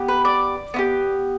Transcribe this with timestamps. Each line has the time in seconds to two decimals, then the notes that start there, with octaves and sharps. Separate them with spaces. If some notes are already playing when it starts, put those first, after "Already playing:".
Already playing: B3 G4
0.08 B4
0.25 D5
0.74 B3 E4 G4